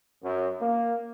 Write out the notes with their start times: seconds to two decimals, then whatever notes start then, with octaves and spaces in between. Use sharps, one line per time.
0.23 F#2
0.61 A#3